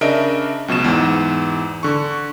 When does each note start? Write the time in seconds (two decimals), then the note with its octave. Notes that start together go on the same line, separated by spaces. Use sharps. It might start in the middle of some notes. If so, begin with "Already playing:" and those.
0.01 C#3 D4 A#4 D#5 E5 D7
0.68 C#2 B2 F#3 E7
0.84 E2 G#2
1.83 D3 C#6